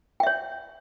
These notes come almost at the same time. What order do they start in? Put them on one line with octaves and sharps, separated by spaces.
G5 E5 C#5